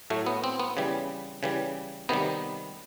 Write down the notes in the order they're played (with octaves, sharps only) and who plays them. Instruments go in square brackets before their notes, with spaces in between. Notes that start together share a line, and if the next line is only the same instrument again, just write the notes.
[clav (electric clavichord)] A2 F#3 A3
B3
C4
B3
C#3 E3 G3
C#3 E3 G3
C3 D#3 G3 B3